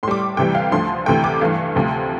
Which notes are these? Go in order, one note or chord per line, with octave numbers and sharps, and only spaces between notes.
A2 G3 C6 D6
D2 C3 E3 G3 G5
F5
D2 D3 F3 A3 C6
D2 C3 E3 A3 G5
D6
G2 E3 A3 F5
D2 C3 F3